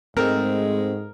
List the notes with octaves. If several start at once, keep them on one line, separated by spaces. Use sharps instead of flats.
G#2 G#3 A3 C4 A#4